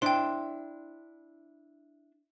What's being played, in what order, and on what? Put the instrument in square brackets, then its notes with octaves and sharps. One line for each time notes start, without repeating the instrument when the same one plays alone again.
[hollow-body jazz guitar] D4 E4 C5 [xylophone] G5 C6